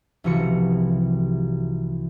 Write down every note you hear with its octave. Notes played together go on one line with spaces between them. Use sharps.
C2 C3 E3 F3 F#4 C#7